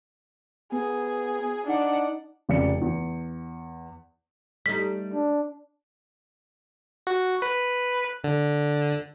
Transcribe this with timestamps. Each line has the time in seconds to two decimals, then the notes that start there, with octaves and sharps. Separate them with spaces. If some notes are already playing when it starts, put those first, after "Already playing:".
0.72 B3 G#4
1.67 D4 D#4 F#5
2.49 F1 C#3 D5 C#7
2.82 E2
4.66 G3 A3 D#4 B6
5.13 D4
7.07 F#4
7.42 B4
8.24 D3